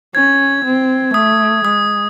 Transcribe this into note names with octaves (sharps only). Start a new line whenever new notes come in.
C#4 G#6
C4
A3 D#6
G#3 D#6